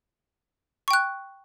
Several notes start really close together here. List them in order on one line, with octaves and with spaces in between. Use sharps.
C#6 G5 F#6